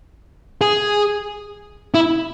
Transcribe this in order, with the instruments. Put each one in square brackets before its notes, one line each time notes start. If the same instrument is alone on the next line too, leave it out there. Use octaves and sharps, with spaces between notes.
[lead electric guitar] G#4
E4